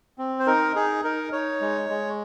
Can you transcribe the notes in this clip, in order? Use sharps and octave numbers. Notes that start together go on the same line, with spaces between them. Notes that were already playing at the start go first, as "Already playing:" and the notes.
C4
C5
D#4 A#4
D#4 G#4
D#4 A#4
D#4 C#5
G#3
G#3